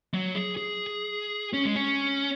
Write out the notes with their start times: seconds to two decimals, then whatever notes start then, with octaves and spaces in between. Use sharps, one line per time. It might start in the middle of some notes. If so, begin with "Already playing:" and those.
0.14 F#3
0.35 G#4
0.57 G#4
1.53 C#4
1.65 G#3
1.76 C#4